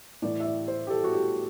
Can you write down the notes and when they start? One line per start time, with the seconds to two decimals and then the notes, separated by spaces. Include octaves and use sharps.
0.22 A2 E3 D5
0.40 E5
0.45 D5
0.68 C5
0.87 G4
0.90 A4
1.04 F#4
1.13 G4